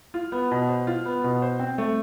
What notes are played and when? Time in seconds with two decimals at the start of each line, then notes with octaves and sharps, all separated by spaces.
0.14 F4
0.32 B3
0.51 B2
0.69 C5
0.87 F4
1.06 B3
1.24 B2
1.42 C5
1.60 C4
1.78 A3